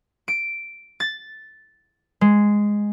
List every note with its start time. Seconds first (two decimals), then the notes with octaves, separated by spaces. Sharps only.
0.28 D7
1.00 A6
2.21 G#3